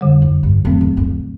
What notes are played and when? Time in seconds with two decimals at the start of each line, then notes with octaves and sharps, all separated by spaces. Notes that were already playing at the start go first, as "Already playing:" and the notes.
0.01 F2 D3 G3
0.22 F#2
0.43 G2
0.65 F2 A2 F#3 A3 C4
0.81 E2
0.97 F2